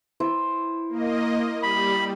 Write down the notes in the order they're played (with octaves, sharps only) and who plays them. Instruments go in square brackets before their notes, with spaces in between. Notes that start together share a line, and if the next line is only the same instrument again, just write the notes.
[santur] E4 C5 E6
[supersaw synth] A#3 D#5
[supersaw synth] G3 [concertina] B5